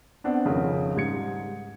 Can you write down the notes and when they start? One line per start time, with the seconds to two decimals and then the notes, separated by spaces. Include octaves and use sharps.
0.24 B3 C4 D4 F#5
0.45 G#1 F2 C#3
0.95 G#2 G3 G#6 C#7